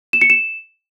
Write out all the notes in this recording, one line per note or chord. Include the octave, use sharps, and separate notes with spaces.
E7
C#7
E7